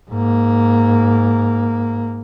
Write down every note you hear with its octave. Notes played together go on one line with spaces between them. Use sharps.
G#2 A#3